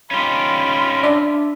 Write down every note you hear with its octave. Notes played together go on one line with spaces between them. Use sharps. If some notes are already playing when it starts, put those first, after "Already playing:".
C#4 D#4 F4 G4 B5
D4 D5 E5